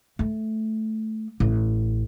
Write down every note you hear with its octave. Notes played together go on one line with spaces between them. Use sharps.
A3
A1